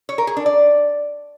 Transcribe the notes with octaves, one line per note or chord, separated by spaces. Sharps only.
C#5
A#4
G#4
D4
D5